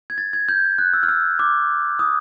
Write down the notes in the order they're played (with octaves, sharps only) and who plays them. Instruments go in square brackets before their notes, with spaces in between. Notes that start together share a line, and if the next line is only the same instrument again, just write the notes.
[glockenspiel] G#6
A6
G#6
G6
F#6
E6
F6
E6
D6
D#6